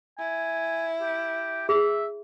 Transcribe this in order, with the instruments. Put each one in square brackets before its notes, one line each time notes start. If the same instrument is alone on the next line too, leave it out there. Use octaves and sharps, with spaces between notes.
[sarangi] E4 [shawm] G#5
[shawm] G4
[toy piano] G#4 [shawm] E5